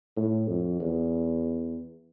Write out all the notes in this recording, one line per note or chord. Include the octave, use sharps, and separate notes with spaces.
A2
F2
E2